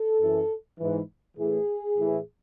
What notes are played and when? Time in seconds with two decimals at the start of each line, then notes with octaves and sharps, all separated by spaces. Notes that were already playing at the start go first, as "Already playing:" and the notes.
Already playing: A4
0.20 F#2 E3
0.79 G#2 E3
1.37 A2 E3 G#4
1.96 A2 E3